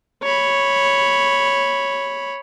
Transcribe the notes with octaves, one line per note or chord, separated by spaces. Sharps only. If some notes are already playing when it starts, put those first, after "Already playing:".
C#5 B5